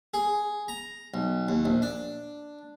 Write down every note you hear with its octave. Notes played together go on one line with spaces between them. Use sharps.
G#4
A#5
B1
D#2
A#1
D4